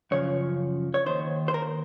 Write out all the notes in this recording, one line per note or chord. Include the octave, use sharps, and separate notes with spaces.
F#2 C#3 F3 C#5
C#5
D#2 D#3 C5
C5
A#4